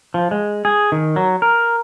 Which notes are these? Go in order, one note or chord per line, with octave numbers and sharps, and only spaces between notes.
F3
G#3
G#4
D#3
F#3
A#4